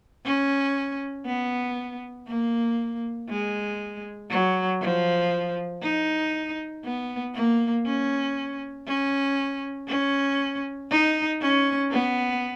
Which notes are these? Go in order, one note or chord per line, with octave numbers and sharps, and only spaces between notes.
C#4
B3
A#3
G#3
F#3
F3
D#4
B3
A#3
C#4
C#4
C#4
D#4
C#4
B3